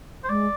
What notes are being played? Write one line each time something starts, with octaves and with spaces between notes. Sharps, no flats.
C5
G#3 D5